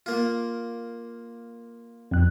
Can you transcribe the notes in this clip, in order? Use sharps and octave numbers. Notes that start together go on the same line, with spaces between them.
A#3 F4
F2 F#6